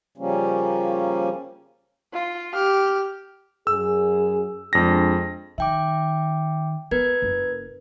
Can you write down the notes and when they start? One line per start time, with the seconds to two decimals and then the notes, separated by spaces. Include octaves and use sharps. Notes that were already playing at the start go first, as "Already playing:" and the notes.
0.18 C#3 F3 G3 A#3 C#4
2.14 F4
2.54 G4 F6
3.67 F#2 G#4 E6
4.73 F2 G#3 D4 A#6
5.58 D#3 E5 G5 D6
6.91 B3 A#4 B4 G#6
7.22 F#1